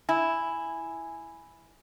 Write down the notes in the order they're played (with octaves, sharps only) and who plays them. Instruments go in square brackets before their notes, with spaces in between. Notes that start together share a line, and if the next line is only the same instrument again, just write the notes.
[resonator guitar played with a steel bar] E4 [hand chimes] G#5